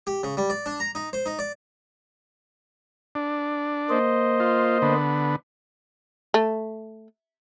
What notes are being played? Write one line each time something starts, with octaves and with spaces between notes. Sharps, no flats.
G4
C#3
G3
D5
D4
A#5
D#4
C5
D#4
D5
D4
A#3 C5 D#5
F4
D3 B3
A3